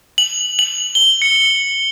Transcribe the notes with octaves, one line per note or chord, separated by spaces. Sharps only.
F#7
F#7
G7
C#7